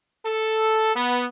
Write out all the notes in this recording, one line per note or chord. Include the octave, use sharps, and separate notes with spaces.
A4
B3